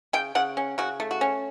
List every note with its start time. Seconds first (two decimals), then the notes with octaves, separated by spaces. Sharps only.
0.13 C#3 G5
0.35 C#3 F#5
0.57 C#4
0.78 C#3 F#4
1.00 A3
1.11 F#4
1.21 C#4